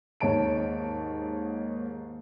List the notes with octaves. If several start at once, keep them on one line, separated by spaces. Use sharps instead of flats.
D#2 G#2 C#5 A5 D7